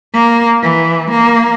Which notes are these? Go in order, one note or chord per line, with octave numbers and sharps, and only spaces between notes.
A#3
E3
A#3